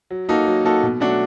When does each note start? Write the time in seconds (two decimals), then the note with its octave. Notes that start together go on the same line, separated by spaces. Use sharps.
0.11 F#3
0.29 A#3 D#4 F#4 A4
0.47 F#3
0.65 A#3 D#4 F#4 A4
0.83 B2
1.00 F#3 A3 D4 F#4